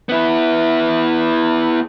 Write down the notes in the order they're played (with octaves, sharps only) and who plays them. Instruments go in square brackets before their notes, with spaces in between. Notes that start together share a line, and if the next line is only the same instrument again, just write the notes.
[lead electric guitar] B3 E4